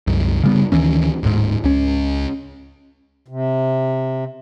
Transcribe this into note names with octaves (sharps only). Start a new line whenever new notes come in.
C2 F#2
C#3 G3 B3
D2 D#3 E3 C#4
D1 G#2
C#2 C#4
C3